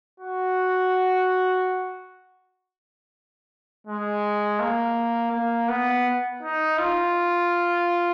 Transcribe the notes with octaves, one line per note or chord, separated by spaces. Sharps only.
F#4
G#3
A#3
A#3
B3
D#4
F4